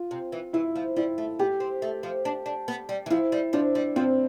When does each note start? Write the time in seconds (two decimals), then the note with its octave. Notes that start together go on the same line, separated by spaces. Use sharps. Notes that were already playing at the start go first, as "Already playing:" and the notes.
Already playing: F4
0.11 C3
0.32 E3
0.53 E3 E4
0.76 F3
0.96 G3 E4
1.18 A3
1.39 B3 G4
1.60 C4
1.82 A3
2.03 F3
2.25 D4
2.46 D4
2.68 B3
2.89 G3
3.06 E3
3.10 F3 E4
3.32 G3
3.53 F3 D4
3.75 G3
3.96 F3 C4